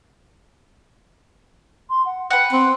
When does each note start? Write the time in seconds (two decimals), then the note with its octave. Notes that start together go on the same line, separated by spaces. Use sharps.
1.90 C6
2.06 F#5
2.30 B4 F#5 G5
2.53 C4 C6